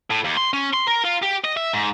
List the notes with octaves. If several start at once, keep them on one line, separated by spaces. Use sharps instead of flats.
A2
D#2
C6
C#4
C6
A#4
F4
G4
D#5
E5
G#2